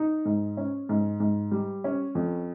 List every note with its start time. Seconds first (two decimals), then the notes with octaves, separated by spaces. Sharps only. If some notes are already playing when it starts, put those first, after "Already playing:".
Already playing: D#4
0.25 G#2
0.57 C#4
0.89 G#2
1.20 G#2
1.51 G3
1.84 C#4
2.15 F2